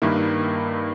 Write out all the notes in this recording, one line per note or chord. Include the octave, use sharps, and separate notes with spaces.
G2 D#3 A#3 E4